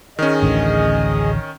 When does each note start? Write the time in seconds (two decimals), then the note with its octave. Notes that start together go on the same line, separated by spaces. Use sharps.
0.19 D#3 C#4 G#4 D#5
0.43 A1 D2 D3